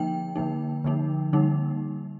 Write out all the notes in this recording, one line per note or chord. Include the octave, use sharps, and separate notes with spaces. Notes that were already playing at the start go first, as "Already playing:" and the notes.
Already playing: D3 F3 A#3 D#4 G5
D3 F3 A#3 D#4
D3 F3 A#3 D#4
D3 G3 A#3 D#4